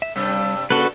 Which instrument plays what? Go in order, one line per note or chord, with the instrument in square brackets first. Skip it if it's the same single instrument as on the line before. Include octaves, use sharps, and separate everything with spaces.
[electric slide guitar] E5
[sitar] G2 C3 [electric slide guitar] G3 [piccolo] E6
[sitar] G2 C#3 A4 [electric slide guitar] A#3 C#4 [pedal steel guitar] F#4 B4